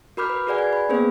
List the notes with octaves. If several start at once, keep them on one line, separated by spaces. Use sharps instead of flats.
F#4 A#4 B5 D6 F6 G6
B4
F#4 G#4 B4 D5 F#5 G#5
G#6
B5
A#3 B3 C#4 G#4 B4 C5